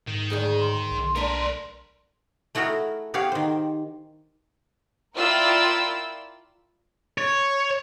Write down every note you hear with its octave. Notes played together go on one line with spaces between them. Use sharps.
G#2 D#3
D2 G#4 C#5
C6
B1
A#3 D4 A#4 B4
A3 E4 F#4 G#4 A#4
B3 G4 G#4 C#5 F5
D#3 C5
E4 F4 A#4 D5 G5 E6
C#5